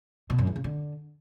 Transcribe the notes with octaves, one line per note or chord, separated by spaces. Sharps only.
B2
F#2
E2
C#3
D3